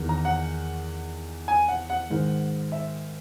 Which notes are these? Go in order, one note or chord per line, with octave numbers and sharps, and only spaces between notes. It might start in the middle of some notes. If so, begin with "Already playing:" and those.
Already playing: E2 D#3
A#5
F#5
G#5
F#5
F#5
G#2 D#3
E5